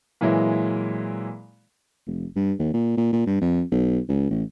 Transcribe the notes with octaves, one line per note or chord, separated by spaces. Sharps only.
A#2 E3 F#3 G#3 E4
F1
G2
D#2
A#2
A#2
A#2
G2
F2
B1
C#2
A1